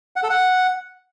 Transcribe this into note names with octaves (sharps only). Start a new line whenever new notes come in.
F#5
A4
F#5